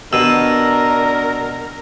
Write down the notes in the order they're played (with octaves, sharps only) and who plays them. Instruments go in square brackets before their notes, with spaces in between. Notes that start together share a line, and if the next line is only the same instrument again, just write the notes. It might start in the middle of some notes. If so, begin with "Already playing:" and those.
[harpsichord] B2 [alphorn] D4 [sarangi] A#4 [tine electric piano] E6